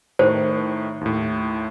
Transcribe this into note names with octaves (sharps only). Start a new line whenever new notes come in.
A2 D#3 C5
D#2 A2